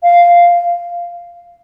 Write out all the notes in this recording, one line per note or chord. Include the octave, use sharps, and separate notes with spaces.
F5